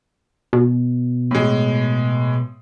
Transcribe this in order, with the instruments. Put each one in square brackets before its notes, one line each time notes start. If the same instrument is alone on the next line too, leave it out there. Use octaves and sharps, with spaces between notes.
[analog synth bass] B2
[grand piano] A2 G#3